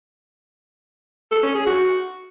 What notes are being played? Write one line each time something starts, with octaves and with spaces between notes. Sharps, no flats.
A4
C#4
G#4
F#4